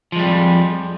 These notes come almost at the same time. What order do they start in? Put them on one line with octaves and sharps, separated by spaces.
F3 G#3 G3 F2